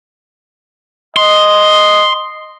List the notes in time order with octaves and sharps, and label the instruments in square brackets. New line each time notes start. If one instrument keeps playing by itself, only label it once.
[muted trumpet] D#5 [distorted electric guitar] C6